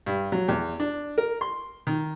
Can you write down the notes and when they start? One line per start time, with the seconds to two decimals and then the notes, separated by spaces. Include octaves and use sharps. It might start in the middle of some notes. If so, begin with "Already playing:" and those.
0.06 G2
0.32 F#3
0.48 E2
0.80 D4
1.18 A#4
1.41 C6
1.87 D#3